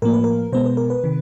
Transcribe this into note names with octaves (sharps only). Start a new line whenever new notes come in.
A2 F3 A#3 A#4
B4
A#4
B2 G#3 B3 C5
B4
A#4
B4
C3 D#3